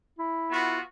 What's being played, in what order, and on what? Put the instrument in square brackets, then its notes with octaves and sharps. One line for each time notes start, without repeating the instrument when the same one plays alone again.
[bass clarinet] E4
[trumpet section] B3 F4 F#4